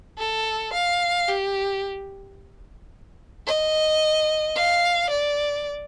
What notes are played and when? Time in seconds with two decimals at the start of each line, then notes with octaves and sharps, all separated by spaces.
0.18 A4
0.73 F5
1.28 G4
3.47 D#5
4.56 F5
5.10 D5